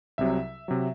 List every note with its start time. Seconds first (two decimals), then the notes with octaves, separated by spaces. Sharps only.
0.18 C2 C3 F#3 E5
0.68 C3 F#3